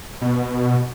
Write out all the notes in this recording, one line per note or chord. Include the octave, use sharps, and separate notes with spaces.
B2